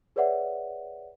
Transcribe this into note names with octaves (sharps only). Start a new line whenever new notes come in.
G#4 B4 C#5 D5 E5 F#5